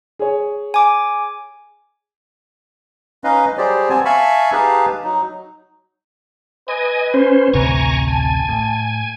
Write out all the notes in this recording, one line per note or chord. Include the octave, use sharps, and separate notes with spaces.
G#4 C#5
G#5 D6
C#4 D#4 B4 D#5 F5
F#3 G3 G4 G#4 C5 D5
B3 C4 G#5 A5
E5 F5 G#5 A5 B5 C#6
D#4 G4 G#4 B4 F5 A5
F#3 D#4
B4 D#5 G#5
C#4 C5
A1 D2 C3 G#5 A#5 C#6
G#5 A5
A2